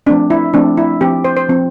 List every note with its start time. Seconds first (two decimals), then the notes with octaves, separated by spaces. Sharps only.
0.06 F3 A3 C4 D4
0.30 E4
0.54 F3 A3 C4 D4
0.77 E4
1.01 F3 C4 G4
1.24 C5
1.37 C5
1.49 F3 C4